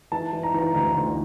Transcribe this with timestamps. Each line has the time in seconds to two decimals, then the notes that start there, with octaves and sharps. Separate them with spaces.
0.12 E3 A5
0.33 E3
0.43 A#5
0.54 E3 A#5
0.74 D2 A#5
0.95 D2